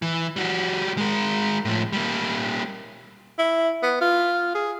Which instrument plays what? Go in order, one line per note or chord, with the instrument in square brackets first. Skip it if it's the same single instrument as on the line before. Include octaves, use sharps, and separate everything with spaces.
[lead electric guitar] E3
G3 F#4
G#3 A#4
A2 F3
G3 A#3
[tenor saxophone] E4
B3
F4
G#4